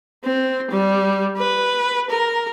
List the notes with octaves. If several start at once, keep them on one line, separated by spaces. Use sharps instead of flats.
C4
G3
B4
A#4